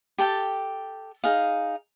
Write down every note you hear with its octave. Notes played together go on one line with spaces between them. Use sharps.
G4 A4 G5 A5
D#4 G#4 F5